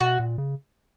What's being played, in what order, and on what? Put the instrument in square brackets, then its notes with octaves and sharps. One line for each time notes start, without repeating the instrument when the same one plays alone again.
[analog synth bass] B2 [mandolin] F#4
[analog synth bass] A#2
C#3